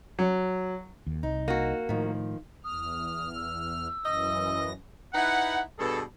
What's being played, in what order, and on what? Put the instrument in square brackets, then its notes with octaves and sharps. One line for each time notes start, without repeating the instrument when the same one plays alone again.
[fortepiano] F#3
[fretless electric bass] D#2
[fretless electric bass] C2 [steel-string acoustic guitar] D#4
[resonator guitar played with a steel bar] A#3 F#4
[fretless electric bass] A2 [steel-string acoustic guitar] D#3 F3
[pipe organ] E2 F6 [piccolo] D#6
[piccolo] E6
[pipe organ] F#2 E3 A#6 [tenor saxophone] D#5
[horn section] D#4 E4 B4 F#5
G2 B2 G#4 A4